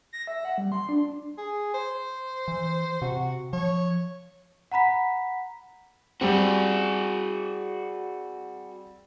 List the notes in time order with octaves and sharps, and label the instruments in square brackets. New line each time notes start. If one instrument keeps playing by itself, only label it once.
[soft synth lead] A#6
E5
F#5
G3
C6
D4
[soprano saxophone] G#4
C5
[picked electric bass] E3
[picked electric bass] C3 [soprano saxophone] F#4
[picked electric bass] F3 [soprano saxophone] C#5
[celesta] F#5 A#5 B5 B6
[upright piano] G3 C4 [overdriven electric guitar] F#4 G#4